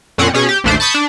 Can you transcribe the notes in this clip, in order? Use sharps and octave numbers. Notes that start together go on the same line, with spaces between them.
F2 A#2 C4 C#4 F#5
B2 C#4 G#4
G4
A1 D#2 A3 D4 C5
A5 B5 C#6 D#6 G6
D4